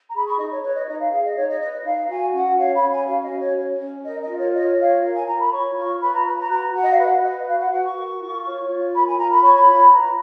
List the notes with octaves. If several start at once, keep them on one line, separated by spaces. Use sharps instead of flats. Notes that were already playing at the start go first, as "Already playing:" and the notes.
A#5
G#4 B5
C#6
D#4 D#5
C#5
B4 C#5
D#5
D#4 D#5
F5
G#4 F5
D#5
D#4 C#5
D#5
B4 D#5
D#4 F5
F#4 G#5
C#4 F#5
C#5 F5
B5
C#4
G#5
F#4 F5
D#5
C#4
C#5
C#5
C#4
A#4 D#5
D#5
F4
C#5
C#5 D#5
F4 F5
A#4
G#5
F4 A#5
B5
C#5 C#6
F4 C#6
B4 B5
A#5
B4 B5
A#5
F#4 A#5
F#4 F#5
D#5
F5
B4 F#5
B4 D#5
F#4 F5
F#5
F#4 F#5
C#6
A#4
F4
C#5
F4
A#4 B5
G#5
F4 A#5
B5
C#5 C#6
B5
F4
B4 A#5